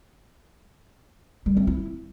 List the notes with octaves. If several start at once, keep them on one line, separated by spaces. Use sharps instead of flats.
G3
C4
E4